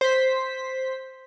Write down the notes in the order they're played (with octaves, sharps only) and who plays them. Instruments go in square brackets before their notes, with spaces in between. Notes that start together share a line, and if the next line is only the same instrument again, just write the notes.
[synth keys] C5 B6